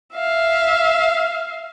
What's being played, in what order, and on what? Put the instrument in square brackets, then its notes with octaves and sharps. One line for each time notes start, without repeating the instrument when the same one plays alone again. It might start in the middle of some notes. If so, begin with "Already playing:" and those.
[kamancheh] E5 F5